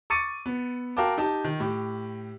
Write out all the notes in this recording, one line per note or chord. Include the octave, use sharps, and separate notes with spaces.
C#6 D6 A6 C#7 D#7
B3
F#4 A#4 F5 G5 A5 D6
D#4 G4 A5
D#3
A2 G4